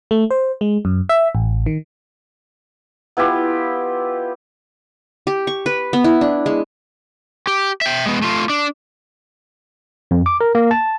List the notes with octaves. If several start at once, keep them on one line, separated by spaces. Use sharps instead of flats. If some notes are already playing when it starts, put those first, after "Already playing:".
A3
C5
G#3
F#2
E5
A1
D#3
B3 E4 F4 G4
G4
C#6
B4
B3
E4
D4
G#3
G4
E5 G5
G#3 B3
A3 F4
D4
F2
D6
A#4
A#3
A5